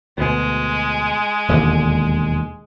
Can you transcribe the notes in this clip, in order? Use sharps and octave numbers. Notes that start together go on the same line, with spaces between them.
D2 B2 G#3
E1 D#2 D3